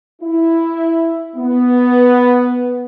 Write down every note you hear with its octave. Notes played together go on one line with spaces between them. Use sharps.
E4
B3